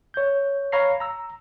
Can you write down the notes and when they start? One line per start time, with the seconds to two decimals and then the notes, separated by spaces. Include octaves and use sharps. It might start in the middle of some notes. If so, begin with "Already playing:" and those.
0.14 C#5 G6
0.72 C#5 F5 A#5 B5 C7
1.00 A#5 E6